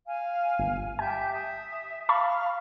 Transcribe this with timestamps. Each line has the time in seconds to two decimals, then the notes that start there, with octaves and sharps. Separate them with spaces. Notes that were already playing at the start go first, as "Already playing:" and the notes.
0.06 F5 G#5
0.59 G1
0.99 G4 E5 G#5 G6
1.31 E5 D#6
2.09 F5 A5 B5 C#6